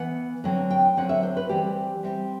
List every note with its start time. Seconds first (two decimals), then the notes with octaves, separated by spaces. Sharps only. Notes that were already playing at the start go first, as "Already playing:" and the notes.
Already playing: E3 B3 F#5
0.44 D3 F#3 C4
0.70 G5
0.97 D3 F#3 C4 F#5
1.09 E5
1.23 C5
1.37 B4
1.49 E3 G3 C4 G4
2.03 E3 G3 C4